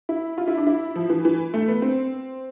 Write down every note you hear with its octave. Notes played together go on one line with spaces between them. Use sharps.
E4
F4
E4
D4
E4
F3
E3
E3
A3
B3
C4